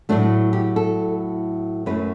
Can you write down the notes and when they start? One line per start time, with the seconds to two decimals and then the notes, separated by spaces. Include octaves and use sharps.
0.09 A2 F#3 A3 D4
0.53 G4
0.76 A4
1.86 F#2 F#3 A3 B4